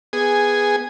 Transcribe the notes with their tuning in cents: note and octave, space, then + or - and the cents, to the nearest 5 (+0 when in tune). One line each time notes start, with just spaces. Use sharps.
B3 +0 G#4 -5 G#5 +0